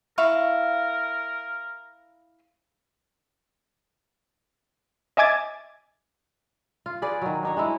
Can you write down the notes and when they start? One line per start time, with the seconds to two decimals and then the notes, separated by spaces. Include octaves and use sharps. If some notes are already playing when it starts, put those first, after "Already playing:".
0.18 E4 A#4 F5 C#6
5.17 D#5 E5 G#5 D6 G#6 A6
6.86 F4
7.02 G#4 B4 D5
7.22 D#3 F#3
7.43 D4 D#4 C#5
7.57 G#3 D#4 E4